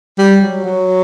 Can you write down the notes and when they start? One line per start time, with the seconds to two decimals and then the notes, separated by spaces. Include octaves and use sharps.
0.18 G3
0.41 F#3
0.64 F#3